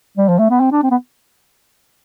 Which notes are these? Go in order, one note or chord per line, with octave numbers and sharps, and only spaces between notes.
G3
F3
A3
B3
C4
D4
C4
B3